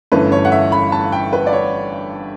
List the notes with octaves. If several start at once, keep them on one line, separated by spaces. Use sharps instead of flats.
G1 G2 E3 A3 C#4 B4
C#5
F#5
E5
B5
A5
G5
B4
D5
C#5